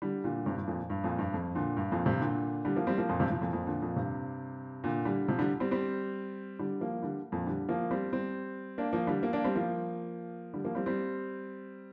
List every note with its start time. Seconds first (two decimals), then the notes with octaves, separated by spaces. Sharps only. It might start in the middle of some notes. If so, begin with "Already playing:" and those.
0.02 D3 G3
0.24 A#2 D3
0.46 G2 C3
0.57 G2
0.67 F2 A#2
0.90 G2
1.04 F2 A#2
1.18 G2
1.34 F2
1.55 A#2 D3
1.77 G2
1.92 F2 A#2
2.06 G2 C3
2.21 A#2 D3
2.65 D3 G3
2.76 F3 A#3
2.87 G3 C4
2.98 F3 A#3
3.09 F2 A#2
3.20 G2 C3
3.31 C3 F3
3.42 F2 A#2
3.52 F2 A#2
3.67 A#2 D3
3.82 F2 A#2
3.96 G2 C3
4.84 A#2 D3
5.05 D3 G3
5.28 C3 F3
5.39 D3 G3
5.60 G3 C4
5.71 G3 C4
6.59 D3 G3
6.81 F3 A#3
7.03 D3 G3
7.32 F2 A#2
7.46 D3 G3
7.69 F3 A#3
7.91 G3 C4
8.13 G3 C4
8.78 A#3 D4
8.93 F3 A#3
9.07 D3 G3
9.22 F3 A#3
9.33 A#3 D4
9.44 G3 C4
9.55 F3 A#3
10.53 D3 G3
10.64 F3 A#3
10.75 G3 C4
10.86 G3 C4